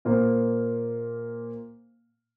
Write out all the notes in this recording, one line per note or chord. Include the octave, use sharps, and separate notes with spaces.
A#2 A#3 F4 C5